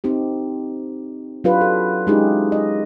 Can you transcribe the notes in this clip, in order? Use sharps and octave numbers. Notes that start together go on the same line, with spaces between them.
C4 D#4 G4
F#3 D4 F4 G4 B4
A4
G#3 C#4 D#4 E4 G4 G#4
D#5